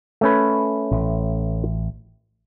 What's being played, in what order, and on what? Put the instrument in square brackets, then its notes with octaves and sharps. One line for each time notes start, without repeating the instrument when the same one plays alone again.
[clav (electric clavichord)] A3 C#4 B4
[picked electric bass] A1